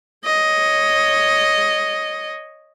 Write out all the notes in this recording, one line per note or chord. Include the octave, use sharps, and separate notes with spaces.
C#5 D#5